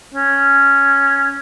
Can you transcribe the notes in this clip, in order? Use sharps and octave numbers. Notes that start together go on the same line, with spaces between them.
C#4